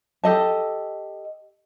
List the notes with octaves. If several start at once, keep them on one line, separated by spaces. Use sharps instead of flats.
G4 A4 D#5 A5